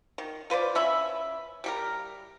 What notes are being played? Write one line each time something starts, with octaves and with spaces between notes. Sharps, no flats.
D#3
F4 B4 C5 D5
C#4 E5 B5
G3 G4 A#4